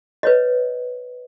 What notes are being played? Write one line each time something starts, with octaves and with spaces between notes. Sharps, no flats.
B4 C#5 D#5